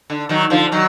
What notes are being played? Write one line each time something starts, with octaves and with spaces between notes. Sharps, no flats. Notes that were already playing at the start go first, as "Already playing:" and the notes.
D3
D#3 F#3
D3 F3
D#3 F#3